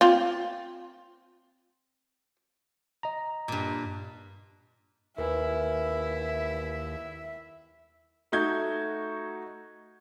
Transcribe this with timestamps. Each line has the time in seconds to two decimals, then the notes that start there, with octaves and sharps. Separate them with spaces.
0.01 C4 F4
3.03 D#5 A#5
3.48 G2 A#2
5.18 D#2 E4 A#4 B4 E5 G#5
8.32 A3 D#4 F#4 G6 G#6